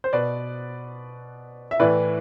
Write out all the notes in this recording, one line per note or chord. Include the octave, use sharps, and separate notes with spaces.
C5
B2 B4 D5
E5
A2 E3 B4 D5